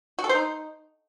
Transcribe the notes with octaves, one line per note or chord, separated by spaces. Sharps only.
F#4
A4
C5
D#4